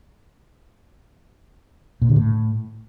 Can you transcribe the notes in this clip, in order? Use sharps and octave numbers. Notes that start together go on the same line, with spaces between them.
A#2
D3
A2